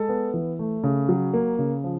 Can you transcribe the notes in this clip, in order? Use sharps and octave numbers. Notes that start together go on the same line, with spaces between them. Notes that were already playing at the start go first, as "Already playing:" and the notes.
Already playing: G#3 A4 A5
B3
E3
A3
C#3
F#3
A#3
C#3
F3